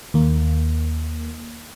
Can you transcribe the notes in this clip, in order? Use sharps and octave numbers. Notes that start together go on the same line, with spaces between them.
D#2 A#3